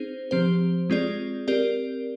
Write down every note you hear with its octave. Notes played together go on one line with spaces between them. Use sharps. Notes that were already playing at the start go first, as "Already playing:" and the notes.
Already playing: C4 D#4 G#4 C5
F3 C4 G4 C5
G#3 C4 F4 G#4 D5
C4 G4 A#4 D5